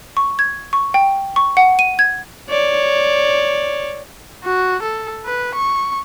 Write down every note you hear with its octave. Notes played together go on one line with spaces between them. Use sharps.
C#6
G#6
C#6
G5
C#6
F#5
D#7
G#6
C#5 D5
F#4
A4
B4
C#6